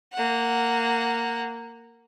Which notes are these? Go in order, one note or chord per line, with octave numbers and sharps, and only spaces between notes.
A#3 F#5